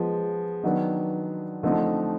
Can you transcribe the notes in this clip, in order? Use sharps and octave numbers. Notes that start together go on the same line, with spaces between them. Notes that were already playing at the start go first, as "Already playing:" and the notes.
Already playing: F3 G#3 B3
D#3 F#3 B3 D4
D3 F3 A3 C4 D#4